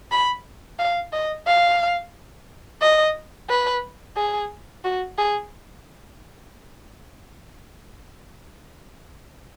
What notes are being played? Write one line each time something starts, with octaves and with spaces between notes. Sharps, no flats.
B5
F5
D#5
F5
D#5
B4
G#4
F#4
G#4